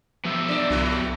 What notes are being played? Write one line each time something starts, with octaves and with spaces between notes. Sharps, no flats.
F3 B3 G4 E5
D4 D5
C2 F3 A3 E4